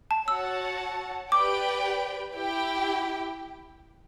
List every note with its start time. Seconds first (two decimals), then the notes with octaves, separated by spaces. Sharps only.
0.11 A5
0.28 F#4 C#5 F#5 A5 E6
1.32 G4 B4 D5 G5 D6
2.36 E4 G4 G5